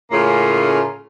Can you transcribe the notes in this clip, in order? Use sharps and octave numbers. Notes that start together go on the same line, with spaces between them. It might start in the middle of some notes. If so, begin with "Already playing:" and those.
A2 C#3 A3 A#3 C#4 F4